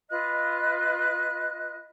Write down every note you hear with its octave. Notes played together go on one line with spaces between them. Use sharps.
F4 B4 D#5 F#6